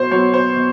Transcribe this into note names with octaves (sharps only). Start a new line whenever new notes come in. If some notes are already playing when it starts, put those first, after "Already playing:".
Already playing: B2 F#3 C5
F#3 B3 C#5
C5
B2